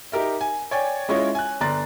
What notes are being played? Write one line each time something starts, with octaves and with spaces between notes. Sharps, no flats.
D#4 G4 A#4 E5
G#5
C#5 D5 G5 G#5
G#3 C#4 E4 F4 C#5 D#5
G#5 F#6
G1 D5 A#5 C6 F#6 A6